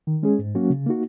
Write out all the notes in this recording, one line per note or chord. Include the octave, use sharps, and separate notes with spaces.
D#3
G#3 C#4 G#4
G#2
F#3 A#3 C#4 F#4
C#3
A#3 D#4 F#4